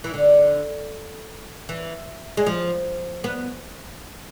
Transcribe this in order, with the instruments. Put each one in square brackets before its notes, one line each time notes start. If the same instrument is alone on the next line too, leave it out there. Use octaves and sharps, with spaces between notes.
[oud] E3
D3
E3
G#3
F3
B3